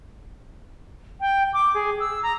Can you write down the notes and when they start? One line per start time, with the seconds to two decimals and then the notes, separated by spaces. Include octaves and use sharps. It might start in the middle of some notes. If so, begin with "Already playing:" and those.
1.21 G5
1.53 D6
1.74 G#4
2.00 E6
2.23 A#5